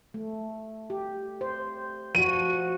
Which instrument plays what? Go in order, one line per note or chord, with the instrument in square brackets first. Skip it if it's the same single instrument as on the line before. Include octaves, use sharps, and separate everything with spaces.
[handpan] A3
G4
C5
[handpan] F3 F#4 [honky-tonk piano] D#7